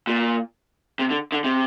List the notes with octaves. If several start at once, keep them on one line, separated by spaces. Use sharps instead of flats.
A#2
C3
D3
D3
C3